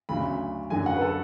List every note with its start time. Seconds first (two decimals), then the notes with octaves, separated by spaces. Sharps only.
0.09 D2 C#3 F#3 B5
0.70 F#2 D3 F#3 G#5
0.86 F#5
0.97 B4
1.01 A4